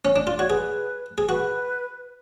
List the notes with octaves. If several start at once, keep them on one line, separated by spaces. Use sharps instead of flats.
C#4
D4
F4 D5
F#4 C#5
G#4 B4
G#4
F#4 B4